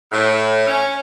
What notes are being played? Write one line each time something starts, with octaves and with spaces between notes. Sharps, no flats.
A2
C#4